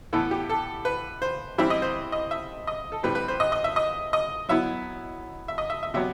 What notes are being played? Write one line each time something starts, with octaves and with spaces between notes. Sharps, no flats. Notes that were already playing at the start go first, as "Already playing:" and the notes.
A2 E3 B3 E4 A4
G4
A4
B4
C5
E3 G3 C4 E4 E5
D#5
C5
D#5
E5
D#5
A4
A2 G3 C4 B4
B4
C5
D#5
D#5
E5
D#5
D#5
F#3 B3 E4 E5
E5
D#5
E5
E5
C3 F#3 B3 E5